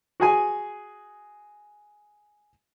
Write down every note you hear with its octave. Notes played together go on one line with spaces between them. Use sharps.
F#4 G#4 G#5